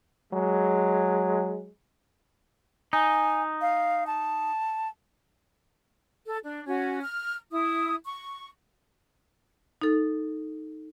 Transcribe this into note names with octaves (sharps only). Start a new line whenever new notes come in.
F#3 G#3
D#4 G#5
F5
A5
A4
D4
C#4 F#4
F6
E4 D#6
C#6
D#4 A4